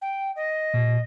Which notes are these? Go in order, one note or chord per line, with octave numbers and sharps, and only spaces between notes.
G5
D#5
A#2